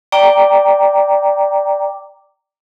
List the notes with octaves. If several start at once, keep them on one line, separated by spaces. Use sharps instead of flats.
D5 G5 A#5 D6